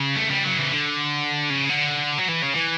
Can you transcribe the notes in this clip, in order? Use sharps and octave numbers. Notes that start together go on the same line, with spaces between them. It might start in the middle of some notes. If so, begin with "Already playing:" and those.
Already playing: C#3
A3
G3
F#3
E3
D3
C#3
D3
F#3
E3
C#3
E3